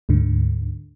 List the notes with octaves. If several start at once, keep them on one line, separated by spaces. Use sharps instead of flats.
D2 G#2 D3